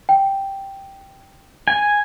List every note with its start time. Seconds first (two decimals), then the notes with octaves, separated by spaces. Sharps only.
0.09 G5
1.68 G#5